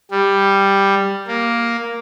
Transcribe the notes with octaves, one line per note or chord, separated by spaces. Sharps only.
G3
A#3